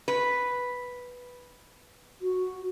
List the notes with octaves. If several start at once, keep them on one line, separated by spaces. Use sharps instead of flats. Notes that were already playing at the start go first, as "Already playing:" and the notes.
B4
F#4